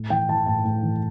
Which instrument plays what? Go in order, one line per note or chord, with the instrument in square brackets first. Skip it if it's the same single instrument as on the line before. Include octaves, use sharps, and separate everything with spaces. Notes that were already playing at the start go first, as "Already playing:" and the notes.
Already playing: [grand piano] A2
E3 G5
E3 A5
A2 A5
A2
E3